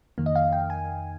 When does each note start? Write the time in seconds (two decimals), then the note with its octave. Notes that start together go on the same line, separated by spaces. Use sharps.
0.18 F2 D#3 A#3
0.26 D#5
0.35 F5
0.53 G5
0.70 G#5